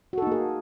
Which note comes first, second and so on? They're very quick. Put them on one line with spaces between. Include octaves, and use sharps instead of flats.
F#4 A4 D#4 A#3 G#4